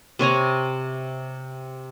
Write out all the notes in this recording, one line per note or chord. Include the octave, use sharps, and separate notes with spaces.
C3 C#5 G#5 A#5